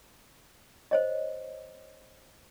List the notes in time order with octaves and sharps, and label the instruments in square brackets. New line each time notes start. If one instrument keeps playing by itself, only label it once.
[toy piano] C5 C#5 D#5